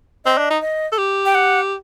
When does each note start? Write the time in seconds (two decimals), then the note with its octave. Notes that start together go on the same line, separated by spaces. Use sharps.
0.25 C4 D#5
0.38 D4
0.50 D#4
0.61 D#5
0.92 A4
0.98 G4
1.26 G5
1.35 F#5